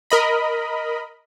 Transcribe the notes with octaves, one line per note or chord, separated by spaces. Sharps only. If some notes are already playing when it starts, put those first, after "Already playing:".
A#4 D#5 B5